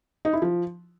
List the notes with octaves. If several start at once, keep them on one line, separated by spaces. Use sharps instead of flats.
D#4
E4
F3